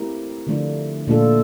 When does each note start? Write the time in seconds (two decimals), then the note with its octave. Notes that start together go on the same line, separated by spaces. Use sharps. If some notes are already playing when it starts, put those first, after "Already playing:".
Already playing: A3 C4 E4 G4 A#4
0.47 D3 F3 A3 D4 F4
1.07 A#2 A3 D4 F4 A4